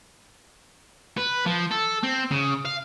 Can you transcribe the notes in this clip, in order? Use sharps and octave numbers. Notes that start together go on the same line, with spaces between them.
B4
F3
A4
C4
C#3
F5